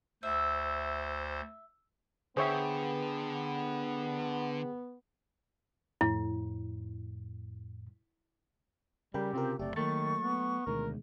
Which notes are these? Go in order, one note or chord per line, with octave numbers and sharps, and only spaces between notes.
D2 C5 E5
D3 B3 G#4 C5 C#5 E5 G5
F2 A2 E4
C#3 G3 G4 A#4 G5 B5
C3 C4 F4 A#4
F#1 C3 A3 G4 D5
D#3 F#3 A3 A#3 C#6 A6 C#7
B3
D2 B2 D#3 G#3 A#4